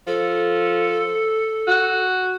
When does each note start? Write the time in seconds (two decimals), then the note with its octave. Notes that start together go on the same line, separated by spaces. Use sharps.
0.07 F3 A4
1.68 F#4